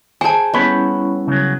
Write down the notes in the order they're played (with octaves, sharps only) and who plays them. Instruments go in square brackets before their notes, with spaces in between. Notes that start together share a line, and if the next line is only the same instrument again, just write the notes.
[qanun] G#4 C5 [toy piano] G#5 A5
[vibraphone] G3 C#4 E4 [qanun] B3 [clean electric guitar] C#5 G5 B5
[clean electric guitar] C#3 F#3